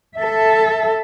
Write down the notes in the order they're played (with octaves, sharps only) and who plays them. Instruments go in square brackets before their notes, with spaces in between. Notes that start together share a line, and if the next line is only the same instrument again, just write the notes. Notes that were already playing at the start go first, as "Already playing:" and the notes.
[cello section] A4 E5